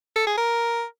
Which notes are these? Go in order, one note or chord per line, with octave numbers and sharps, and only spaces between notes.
A4
G#4
A#4